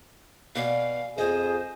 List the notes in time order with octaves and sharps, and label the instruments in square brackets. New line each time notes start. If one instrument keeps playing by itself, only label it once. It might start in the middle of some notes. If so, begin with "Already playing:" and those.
[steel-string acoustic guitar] B2 D5 G#5 [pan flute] F5
[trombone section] F2 G#4 [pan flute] C5 [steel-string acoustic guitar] D#5